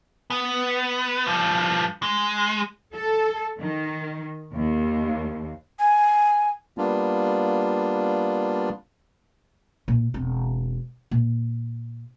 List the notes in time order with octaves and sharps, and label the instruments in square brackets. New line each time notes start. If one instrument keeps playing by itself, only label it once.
[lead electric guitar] B3
G2 F3
G#3
[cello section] A4
D#3
D#2
[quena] G#5
[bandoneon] G3 A#3 B3 D4 F4
[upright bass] A#2 E4
E1 C4
A#2